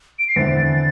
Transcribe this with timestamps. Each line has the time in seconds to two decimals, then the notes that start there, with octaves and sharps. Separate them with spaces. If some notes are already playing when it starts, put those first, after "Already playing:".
0.19 D7
0.28 C7
0.36 E2 D3 C4 E4 A6